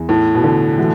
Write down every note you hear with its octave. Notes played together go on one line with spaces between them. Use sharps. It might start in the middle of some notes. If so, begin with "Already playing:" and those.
Already playing: E2 E3
A2
B2
D3
E3 A3 F#4